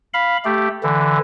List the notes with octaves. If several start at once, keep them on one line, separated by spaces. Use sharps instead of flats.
F5 B5
A3 G4
D3 E3